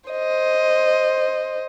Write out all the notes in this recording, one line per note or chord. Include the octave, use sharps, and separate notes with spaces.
C5 D#5